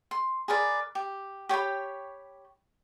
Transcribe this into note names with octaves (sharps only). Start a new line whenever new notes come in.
C6
G#4 A#4 B4 D5
G4
G4 C#5 G5 B5